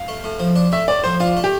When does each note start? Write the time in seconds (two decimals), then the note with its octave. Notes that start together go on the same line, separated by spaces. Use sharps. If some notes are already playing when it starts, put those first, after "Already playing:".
Already playing: F5
0.08 A3
0.24 A2
0.39 F3
0.55 D4
0.72 A3 E5
0.88 A2 D5
1.04 F3 C5
1.20 D4 F4
1.37 A3
1.44 G4